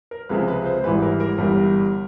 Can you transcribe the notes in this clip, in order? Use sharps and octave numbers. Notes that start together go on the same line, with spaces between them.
A#4
C#2 C3 F3 G#3 B4
B4
C5
G#1 G#2 E3 G3 B4
A#4
A#4
G1 G2 E3 G3